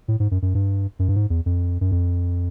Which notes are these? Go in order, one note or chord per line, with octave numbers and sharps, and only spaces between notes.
A2
G#2
F#2
F#2
G2
F#2
G2
G#2
E2
F2
F#2
F2